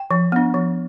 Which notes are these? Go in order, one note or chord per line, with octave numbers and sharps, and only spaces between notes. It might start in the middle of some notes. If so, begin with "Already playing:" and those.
Already playing: G5
F3
B3 D4
F3